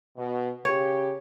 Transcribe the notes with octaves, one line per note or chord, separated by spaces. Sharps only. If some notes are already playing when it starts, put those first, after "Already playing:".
B2
C#3 G4 C#5